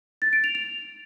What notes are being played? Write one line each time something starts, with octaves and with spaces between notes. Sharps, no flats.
A6
D7
F7
F7